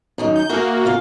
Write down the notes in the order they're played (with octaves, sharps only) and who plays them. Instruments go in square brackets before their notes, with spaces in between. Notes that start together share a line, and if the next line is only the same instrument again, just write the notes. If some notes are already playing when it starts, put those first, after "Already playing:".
[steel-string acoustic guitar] F#2 D#3 D#4
[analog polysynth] G6
[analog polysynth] A#3 F#4 [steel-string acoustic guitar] G#4 A#4 E5
[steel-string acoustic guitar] C#3 F4 F5